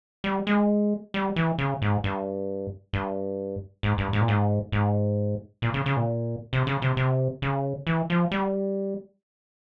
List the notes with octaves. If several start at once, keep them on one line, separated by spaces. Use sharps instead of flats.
G3
G#3
G3
E3
C#3
G#2
G2
G2
G#2
G2
G#2
A#2
G#2
G#2
A#2
C#3
C#3
A#2
C3
C#3
C3
C3
C#3
E3
F3
G3